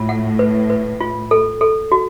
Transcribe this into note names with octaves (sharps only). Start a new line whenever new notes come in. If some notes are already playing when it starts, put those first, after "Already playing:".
Already playing: A2 F4
F#5
B4
B4
F4
A4
A4
F#4